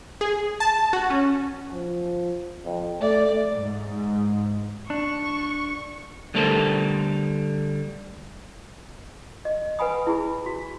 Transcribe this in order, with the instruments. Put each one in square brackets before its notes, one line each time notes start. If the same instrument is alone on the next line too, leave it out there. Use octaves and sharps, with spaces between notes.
[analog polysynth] G#4
A5
F#4
C#4
[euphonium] F3
F2
[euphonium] A3 [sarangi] D5
[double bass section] G#2
[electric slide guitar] D4 [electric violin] C#6
[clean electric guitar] D3 G3 A3 A4 A#4 C5
[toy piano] D#5
B4 F#5 G#5 B5 D#6
E4 G#4 B5
F#4